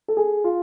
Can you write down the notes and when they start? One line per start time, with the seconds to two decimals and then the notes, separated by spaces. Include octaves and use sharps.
0.08 A4
0.17 G#4
0.44 F4